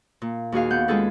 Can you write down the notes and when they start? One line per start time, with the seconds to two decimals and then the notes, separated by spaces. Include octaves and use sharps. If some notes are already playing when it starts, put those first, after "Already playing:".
0.22 A#2
0.52 D#2 F#4 G#4 F5
0.70 B3 F#5 G6
0.88 G#3 C#4 F4 G#4 A4 B4